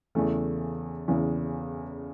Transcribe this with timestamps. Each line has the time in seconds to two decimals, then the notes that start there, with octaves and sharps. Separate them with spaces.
0.15 E2 C#3 E3 A3
1.08 E2 C#3 E3